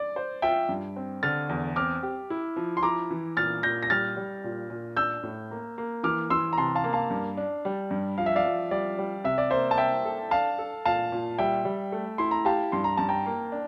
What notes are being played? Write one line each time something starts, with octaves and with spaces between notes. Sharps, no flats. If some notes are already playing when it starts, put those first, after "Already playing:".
Already playing: D5
C5
F4 E5 G5
G2
C4
D3 F6 A6
E2
C4 D6 F6
G4
E4
F3
C6
E4 A#5 D6
E3
A#2 F6 A6
A#2 G6 A#6
A#6
G3 F6 A6
G3
A#2
A#2
D4 E6 G6
A2
A#3
A#3
E3 D6 F6
E3 C6 E6
A#5
C3 A5 C6
F5 A5
A#3
F5 A5
G2
D4
G3
G2
F3 F5
E5
D5 F5
F3
G3 D5
G3
C3 E5
D5
A#3 C5 E5
A5
C5 E5 G5
A4
D4 F5 A5
A4
A#2 F5 A5
A#2
G3 E5 G5
G3
A3
E4 C6
A#5
G4 F5 A5
G2 C6
A#5
G2 A5
G5 A#5
A#3
D4